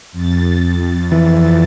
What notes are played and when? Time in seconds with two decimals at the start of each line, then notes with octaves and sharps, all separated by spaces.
0.12 F2 A6
1.12 E3